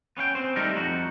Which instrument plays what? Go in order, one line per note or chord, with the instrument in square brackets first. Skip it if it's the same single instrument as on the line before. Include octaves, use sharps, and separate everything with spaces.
[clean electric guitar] B3 C#4 F5 G5
C4 C5
G3 A3 D#4 G4 A4 A#4
F2 D#4 F#4